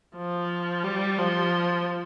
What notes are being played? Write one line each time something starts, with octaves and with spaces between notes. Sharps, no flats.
F3
G3
F3